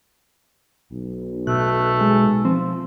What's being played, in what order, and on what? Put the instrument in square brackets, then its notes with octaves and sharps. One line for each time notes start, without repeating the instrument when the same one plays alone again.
[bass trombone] B1
[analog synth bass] B2 [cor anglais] A3 [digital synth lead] F#6
[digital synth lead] G#3
[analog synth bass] F3 [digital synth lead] C4